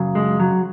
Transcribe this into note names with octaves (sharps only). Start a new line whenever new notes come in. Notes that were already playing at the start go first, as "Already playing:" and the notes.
Already playing: F#2 C#3 F#3
G#3
F#3